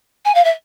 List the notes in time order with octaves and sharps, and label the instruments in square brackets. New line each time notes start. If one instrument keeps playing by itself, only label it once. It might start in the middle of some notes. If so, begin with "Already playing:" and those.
[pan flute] G#5
F5
E5